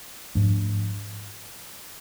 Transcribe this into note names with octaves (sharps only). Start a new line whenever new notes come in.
G#2 F3 A3 D4